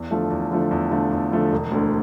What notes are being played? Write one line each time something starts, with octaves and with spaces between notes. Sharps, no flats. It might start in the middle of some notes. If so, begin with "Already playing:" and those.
Already playing: E2
D3 F3 A3
E2
D3 F3 A3
E2
D3 F3 A3
E2
D3 F3 A3
E1
D2 D3